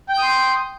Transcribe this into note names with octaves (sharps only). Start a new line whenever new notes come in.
G5 C6 D#6 G6